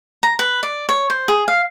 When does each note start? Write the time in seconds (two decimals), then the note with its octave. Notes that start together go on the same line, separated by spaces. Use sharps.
0.23 A#5
0.39 B4
0.63 D5
0.89 C#5
1.10 C5
1.28 G#4
1.48 F5